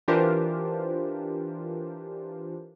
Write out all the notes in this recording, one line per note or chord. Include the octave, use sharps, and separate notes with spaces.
E3 D4 F4 G4 A#4 C5